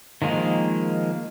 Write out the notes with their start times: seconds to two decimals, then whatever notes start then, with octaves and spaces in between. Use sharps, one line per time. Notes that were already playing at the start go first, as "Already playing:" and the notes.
0.22 D#3 F3 G#3 A#3